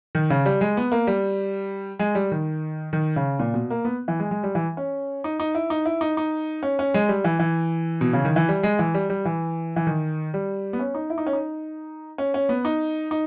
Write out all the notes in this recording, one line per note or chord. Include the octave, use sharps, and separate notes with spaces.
D#3
C#3
G3
G#3
B3
A#3
G3
G#3
G3
D#3
D#3
C#3
A#2
B2
A#3
B3
E3
G#3
G#3
G3
E3
C#4
D#4
D#4
E4
D#4
E4
D#4
D#4
C#4
C#4
G#3
G3
E3
E3
B2
C#3
D#3
E3
G3
G#3
E3
G3
G3
E3
E3
D#3
G3
B3
C#4
D#4
E4
D#4
C#4
D#4
C#4
C#4
B3
D#4
D#4